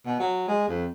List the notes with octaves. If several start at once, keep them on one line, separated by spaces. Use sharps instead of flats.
B2
F#3
G#3
F2